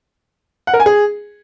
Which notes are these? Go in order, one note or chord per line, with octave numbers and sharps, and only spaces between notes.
F#5
A#4
G#5
G#4